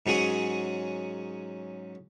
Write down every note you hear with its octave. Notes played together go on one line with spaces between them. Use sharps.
G#2 F#3 C#4 G#4 F#5